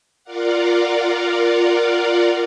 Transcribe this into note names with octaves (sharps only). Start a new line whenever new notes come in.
F4 A#4 D5 F5 F#5